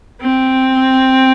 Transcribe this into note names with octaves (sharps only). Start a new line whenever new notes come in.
C4